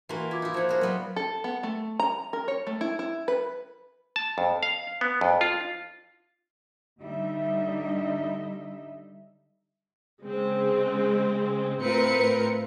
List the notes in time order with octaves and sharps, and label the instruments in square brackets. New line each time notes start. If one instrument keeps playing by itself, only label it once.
[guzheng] E3 A#3 [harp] F4 F#4 B5
[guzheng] E4 [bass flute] F4 [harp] D6 G#6
[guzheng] D#4 E4
[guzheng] F3 F#5 [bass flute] C5
[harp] F4 A#4 E5 [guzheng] F#4 G#4 [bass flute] C5
[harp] F#3 [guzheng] G3 B3 B4
[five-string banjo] A4
B3
A3
A#5
A#4
C#5
A3
E4
E4
B4
[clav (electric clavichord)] A5
F2
F5
B3
F2
F4
[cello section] D3 G3 D#4 E5
[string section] C#3 G#3 C4
A2 C4 F4 A#4 B4 C#7